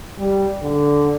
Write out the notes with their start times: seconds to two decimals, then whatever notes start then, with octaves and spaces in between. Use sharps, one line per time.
0.18 G3
0.62 D3